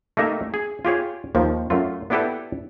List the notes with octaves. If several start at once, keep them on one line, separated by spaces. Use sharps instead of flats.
A3 A#3 D#4 G4 E5
G#4
F4 G4 G#4 C#5
D#2 D#3 F3
F#2 A3 F4
B3 D4 E4 G4 A4 B4